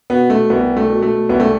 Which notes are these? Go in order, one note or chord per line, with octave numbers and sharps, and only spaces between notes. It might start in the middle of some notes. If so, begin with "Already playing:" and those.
B2 B3
A3
C2 B3
A3
B2
A3
C2 B3
A3